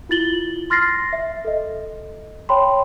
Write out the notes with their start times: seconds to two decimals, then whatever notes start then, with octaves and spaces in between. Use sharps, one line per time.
0.09 E4 F4 A6 F#7 G7
0.70 C6 F6 A6 A#6 C7
1.13 E5
1.45 A4 D#5
2.49 C#5 G5 A5 B5 C6